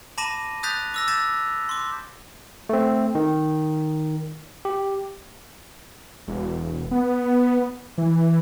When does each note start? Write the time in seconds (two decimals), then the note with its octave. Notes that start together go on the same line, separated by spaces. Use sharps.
0.18 A5 B5 D6 A#6 D#7 E7
0.63 D#6 F#6 G6 A6 B6 F7
0.94 D6 E6 A#6
1.08 D6 E6 G6 A6 B6 E7
1.69 C6 D6
2.69 A3 C4
3.15 D#3
4.65 G4
6.28 E1
6.91 B3
7.98 E3